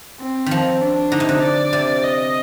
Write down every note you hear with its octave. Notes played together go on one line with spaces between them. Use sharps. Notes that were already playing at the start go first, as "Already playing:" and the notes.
C4
D#3 F3
D4
D3 D#4
C3
D3
D5
C3
D#5